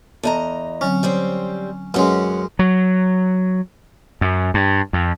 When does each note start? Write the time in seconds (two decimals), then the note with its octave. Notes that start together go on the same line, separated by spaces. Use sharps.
0.23 E2 A4 D#5 A5 A#5
0.81 D3 F#3 C4 C#4
1.03 G3 C4 C5 C#5
1.94 F#2 G#3 C#4 B4 F#5
2.59 F#3
4.21 F#2
4.54 G2
4.93 F2